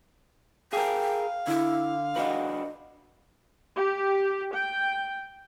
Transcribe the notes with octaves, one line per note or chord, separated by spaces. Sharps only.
G#4 A#4 F5 G5
D3 E4
D4 F#4 B4 D#5
G4
G5